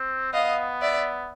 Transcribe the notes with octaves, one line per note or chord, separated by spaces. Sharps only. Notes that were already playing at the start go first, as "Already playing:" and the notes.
Already playing: C4
B3 D#5 F5
D5 E5